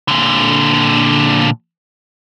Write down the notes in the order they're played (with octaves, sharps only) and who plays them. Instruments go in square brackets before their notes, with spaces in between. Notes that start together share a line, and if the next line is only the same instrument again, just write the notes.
[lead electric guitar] A#2 D3